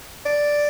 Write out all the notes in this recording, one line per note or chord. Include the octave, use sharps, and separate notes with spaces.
D5